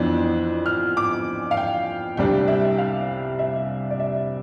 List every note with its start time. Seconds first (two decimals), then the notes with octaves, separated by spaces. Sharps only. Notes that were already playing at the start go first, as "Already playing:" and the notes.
Already playing: F2 E3 B3 D4
0.66 F6
0.97 D6
1.51 F5
1.57 G5
2.17 C2 C3 G3 D4 G5
2.48 E5
2.78 F5
3.39 E5
3.90 D5
4.00 E5